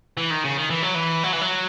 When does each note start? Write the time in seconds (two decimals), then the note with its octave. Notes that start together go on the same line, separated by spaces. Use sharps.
0.17 E3
0.31 D#3
0.44 C#3
0.57 D#3
0.70 E3
0.83 F#3
0.95 E3
1.23 F#3
1.33 E3
1.41 F#3